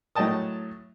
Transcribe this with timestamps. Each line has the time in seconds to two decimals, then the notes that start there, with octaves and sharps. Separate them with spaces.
0.15 A2 F#3 D#5 G5 A5 D#6